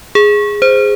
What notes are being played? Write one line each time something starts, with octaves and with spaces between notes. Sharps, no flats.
G#4
C5